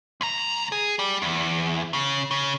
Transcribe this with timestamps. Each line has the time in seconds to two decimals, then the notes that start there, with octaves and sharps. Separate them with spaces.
0.21 D2 A#5
0.72 G#4
0.99 G3 G4
1.22 E2
1.93 C#3
2.31 C#3